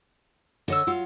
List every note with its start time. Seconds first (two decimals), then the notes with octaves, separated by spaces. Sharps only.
0.68 D3 C#5 D#5 E6
0.87 F#3 F4